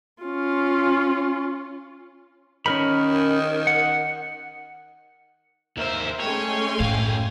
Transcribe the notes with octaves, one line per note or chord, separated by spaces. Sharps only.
C#4 F4
D#3 C#4 A#4 B5
F#5
D#2 A#4 C5 E5
G#3 A3 C#4 C#5 G5 G#5 C6
F#2 A2 F5